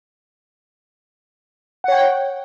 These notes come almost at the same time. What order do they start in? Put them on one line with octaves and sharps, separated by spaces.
F#5 C#5 G5